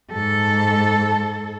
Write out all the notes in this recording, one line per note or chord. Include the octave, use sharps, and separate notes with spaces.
G#2 A4